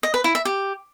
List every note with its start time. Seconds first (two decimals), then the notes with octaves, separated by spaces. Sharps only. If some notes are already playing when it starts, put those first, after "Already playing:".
0.03 D#5
0.14 B4
0.24 E4
0.35 E5
0.45 G4